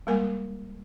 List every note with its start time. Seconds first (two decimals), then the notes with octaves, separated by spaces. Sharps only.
0.07 G3 G#3 A#3 A#4 G#5